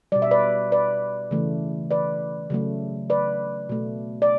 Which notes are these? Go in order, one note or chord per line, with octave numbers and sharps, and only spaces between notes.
B2 G3 D5
E5
B4 D5
B4 D5
C#3 E3 A3
B4 D5
C#3 F#3 A3
B4 D5
B2 A3
D5